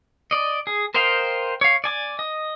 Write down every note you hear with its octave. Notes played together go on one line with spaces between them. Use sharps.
D5 D#5
G#4
A#4 C5 D#5 F5 G5
C#5 F5
D5 G#5 D6
D#5